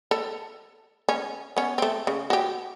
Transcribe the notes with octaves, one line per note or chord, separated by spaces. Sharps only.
A4
C#4
B3 C#4
A3 C4
C#3
F#4 G4